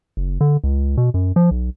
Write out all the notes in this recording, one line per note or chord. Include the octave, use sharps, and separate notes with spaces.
F#1
D3
C#2
B2
F#2
F3
B1